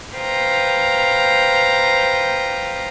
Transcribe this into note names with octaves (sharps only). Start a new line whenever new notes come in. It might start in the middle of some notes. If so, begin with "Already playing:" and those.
B4 C5 F5 G5 A#5